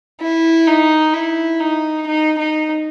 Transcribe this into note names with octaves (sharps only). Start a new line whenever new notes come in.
E4
D#4
E4
D#4
D#4
D#4